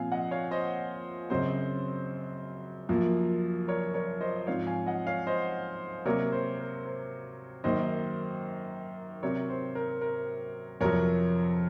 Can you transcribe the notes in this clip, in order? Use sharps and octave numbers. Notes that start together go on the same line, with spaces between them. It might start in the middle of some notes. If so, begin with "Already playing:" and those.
Already playing: A#2 F3 C4 F5 G#5
D#5 F#5
C#5 F5
C5 D#5
F#2 C#3 F#3 C4 C5 D#5
F#2 F3 A#3
A#4 C#5
A#4 C#5
C5 D#5
G#2 F3 C4 C#5 F5
F5 G#5
D#5 F#5
C#5 F5
C5 D#5
C3 F#3 A#3 A#4 C#5
C5
A#4
C5
F#2 D#3 A#3 C5 D#5
C3 F#3 C4 A#4 C#5
C5
A#4
A#4
F2 C3 F#3 A#4 C#5